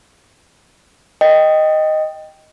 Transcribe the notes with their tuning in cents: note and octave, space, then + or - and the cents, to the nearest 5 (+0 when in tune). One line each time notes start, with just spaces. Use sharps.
D#5 +0 G5 +0